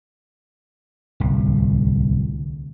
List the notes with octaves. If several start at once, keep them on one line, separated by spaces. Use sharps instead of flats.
D1 C2